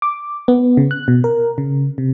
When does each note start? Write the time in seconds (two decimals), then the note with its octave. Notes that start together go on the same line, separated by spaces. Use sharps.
0.02 D6
0.48 B3
0.77 C#3
0.91 F#6
1.08 B2
1.24 A#4
1.58 C#3
1.98 C3